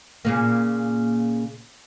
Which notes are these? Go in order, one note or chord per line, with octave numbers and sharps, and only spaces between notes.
A#2 C#3 A#3